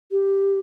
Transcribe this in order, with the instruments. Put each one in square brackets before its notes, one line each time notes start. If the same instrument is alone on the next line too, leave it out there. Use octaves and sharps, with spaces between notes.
[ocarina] G4